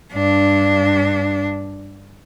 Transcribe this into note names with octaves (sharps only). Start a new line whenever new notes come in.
G2 D4